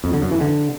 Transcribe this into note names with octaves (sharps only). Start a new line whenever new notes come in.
F2
D3
F#2
E3
D3